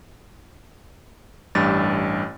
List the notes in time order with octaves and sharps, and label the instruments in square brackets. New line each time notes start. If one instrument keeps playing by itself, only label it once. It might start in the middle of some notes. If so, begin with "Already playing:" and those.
[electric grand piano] A1 G2 G4 A6